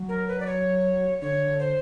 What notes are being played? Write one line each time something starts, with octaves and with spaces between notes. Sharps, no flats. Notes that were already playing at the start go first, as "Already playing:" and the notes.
Already playing: F#3
A#4
B4
D5
C#5
D3 C#5
D3
C5